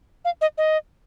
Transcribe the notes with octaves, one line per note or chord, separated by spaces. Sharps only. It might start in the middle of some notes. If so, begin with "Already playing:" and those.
F5
D#5
D#5